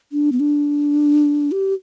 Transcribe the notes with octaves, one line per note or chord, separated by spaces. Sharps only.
D4
B3
D4
G4